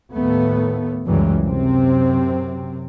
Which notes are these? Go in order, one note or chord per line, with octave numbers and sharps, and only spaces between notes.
D#2 A2 A3 B3
C#2 F#2 C#3 E3 G3 G#3
F#2 C3 C4